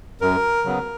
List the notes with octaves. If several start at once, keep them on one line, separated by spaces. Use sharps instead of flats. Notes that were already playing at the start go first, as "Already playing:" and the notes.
F#2 A#4
C#3 F#3 B3